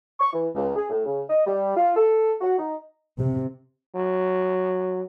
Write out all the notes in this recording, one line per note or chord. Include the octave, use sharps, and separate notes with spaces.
C#6
E3
C#2
G#4
A2
C#3
D#5
G3
F4
A4
F#4
D#4
C3
F#3